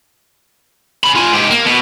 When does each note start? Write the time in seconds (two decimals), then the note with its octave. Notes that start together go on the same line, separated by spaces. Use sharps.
1.04 C#4 B5
1.16 F4 G#5
1.33 G#2 G4
1.51 A#3
1.65 B2 B3